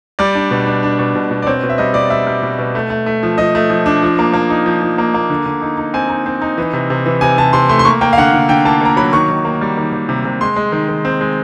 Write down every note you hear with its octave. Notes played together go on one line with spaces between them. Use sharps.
G3 D5
D4
B2
D4
D4
B2
B2
B2
D5
C4 C#5
B2
E5
G3 D#5
B2 D5
G3 E5
G3
B2
B2
A3
A3
A3
F3
F3 D#5
A3
F3
D4
F3
A#3
A#3
D#4
F3
F3
A#3
A#3
D3
D3
D#4
D#4
C4 G#5
D#4
C4
D#4
E3
C3
C3
E3
C3 G#5
C3 A5
C3 C6
A3 C6
C6
A#3 C#6
A#3 G5
F5
D3 F#5
D3
D3 G5
A#3 A5
A#3 A#5
F#3 B5
D#3 C#6
D#3
A#3
G3
D#3
D#3
C3
C3
G#3 C6
G#3
D#3
D#3
C4
G#3